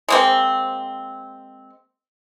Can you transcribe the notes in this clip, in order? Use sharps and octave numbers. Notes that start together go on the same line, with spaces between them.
G#3 A#3 C4